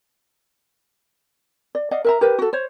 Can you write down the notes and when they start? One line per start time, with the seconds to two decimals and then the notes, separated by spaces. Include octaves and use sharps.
1.75 D5
1.91 D5 D#5 F5 F#5
2.04 A#4 E5 A#5
2.21 G4 A#4 B4
2.39 F#4 A4
2.53 C5 C#5